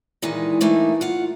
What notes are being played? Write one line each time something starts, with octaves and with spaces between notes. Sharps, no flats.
A#2 D#3 E3 G#3 D#4
E3 A3 A#3 D#4
F4 F#5